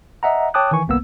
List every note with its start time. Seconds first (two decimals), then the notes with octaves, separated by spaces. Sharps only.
0.23 D#5 E5 F#5 A#5
0.54 C#5 G5 A5 D6 D#6 F#6
0.71 D#3 E3 G#5 C#6
0.88 G1 C2 A#3 B3 E6